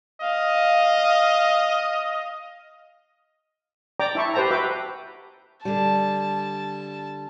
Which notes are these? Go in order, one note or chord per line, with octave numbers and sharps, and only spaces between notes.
D#5 F5
D5 G5 A#5 D6
E4 E5 A5 C#6
G4 B4 C5 G5 A5 A#5
F#4 B4 E5 G5 D6
D3 G3 A5